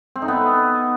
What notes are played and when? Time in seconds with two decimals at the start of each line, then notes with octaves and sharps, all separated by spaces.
0.16 C4
0.22 D#4
0.28 B3